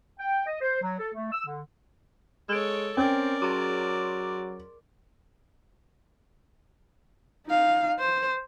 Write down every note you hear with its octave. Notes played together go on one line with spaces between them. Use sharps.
G5
D#5
C5
F#3
A4
A3
E6
D3
G#3 A4 C#5 E6 D7
C4 C#4 A#4 D5 G5
F#3 G#4 C6 D6
D#4 F5
C5